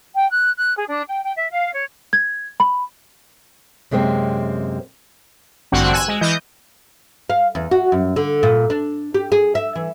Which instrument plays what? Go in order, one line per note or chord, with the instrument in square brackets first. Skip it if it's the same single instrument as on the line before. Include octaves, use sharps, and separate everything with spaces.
[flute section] G5
F#6
F#6
G#4
D4
G5
G5
E5
F5
C#5
[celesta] G#6
B5
[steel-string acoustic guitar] F#2 C3 G#3 A#3 C4
[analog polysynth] A1 G2 D3 C4 F#4 F#5
G#5 E6 F#6
G#3
E3 D#5 G6
[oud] F5
E2
F#4
F#2
D3
A#2
D4
G4
G#4
E5
E3